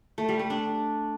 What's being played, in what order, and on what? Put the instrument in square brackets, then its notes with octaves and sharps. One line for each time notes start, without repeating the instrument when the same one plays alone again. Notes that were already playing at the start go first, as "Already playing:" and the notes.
[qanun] A3
G3
A3
D4